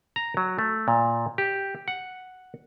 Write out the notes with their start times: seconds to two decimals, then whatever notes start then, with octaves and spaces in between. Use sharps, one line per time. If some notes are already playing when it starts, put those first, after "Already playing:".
0.16 A#5
0.37 F#3
0.59 A3
0.88 A#2
1.38 G4
1.88 F#5